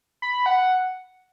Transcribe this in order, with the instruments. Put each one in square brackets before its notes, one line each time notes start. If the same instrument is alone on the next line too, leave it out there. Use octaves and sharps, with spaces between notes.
[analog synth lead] B5
F#5